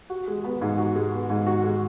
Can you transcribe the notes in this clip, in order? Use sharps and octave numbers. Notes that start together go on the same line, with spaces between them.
F#4
G#3
B3
G#2
F#4
G#3
B3
G#2
F#4
G#3